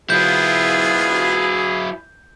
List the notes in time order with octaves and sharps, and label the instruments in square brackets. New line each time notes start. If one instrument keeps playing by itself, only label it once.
[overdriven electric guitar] F#3 E4 [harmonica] B3 F4 [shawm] G#4 [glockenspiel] G6